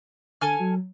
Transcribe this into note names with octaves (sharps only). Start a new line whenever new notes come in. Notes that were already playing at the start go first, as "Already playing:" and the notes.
D3 A4 G#5 F6
F#3